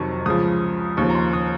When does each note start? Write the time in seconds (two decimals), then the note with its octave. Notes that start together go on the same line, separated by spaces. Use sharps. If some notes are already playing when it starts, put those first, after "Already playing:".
Already playing: F2 C3 D#3 F#3 C#6
0.26 C#2 C#3 F3 D#6
0.97 D#2 C#3 F3 C#6
1.10 A#5
1.15 C6
1.33 D#6